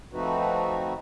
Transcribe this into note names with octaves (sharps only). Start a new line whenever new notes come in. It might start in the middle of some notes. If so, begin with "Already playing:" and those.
F3 A3 C4 D#4 F#4 B4